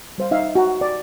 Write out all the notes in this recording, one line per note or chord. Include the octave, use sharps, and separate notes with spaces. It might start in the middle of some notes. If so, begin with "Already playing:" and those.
G3 C5 F5
D#4 E5 F5
F#4 A#5
D5